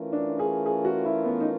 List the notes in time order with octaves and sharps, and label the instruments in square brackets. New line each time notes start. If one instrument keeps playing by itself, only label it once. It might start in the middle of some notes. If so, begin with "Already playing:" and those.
Already playing: [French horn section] E3 A3 C#4 F4 A#4
[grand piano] D4
G#4
G#4
F#4
E4
B3
D#4